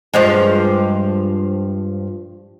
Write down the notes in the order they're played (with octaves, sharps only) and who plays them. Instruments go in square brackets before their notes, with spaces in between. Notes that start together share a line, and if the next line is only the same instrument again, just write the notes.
[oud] G2 F3 G#3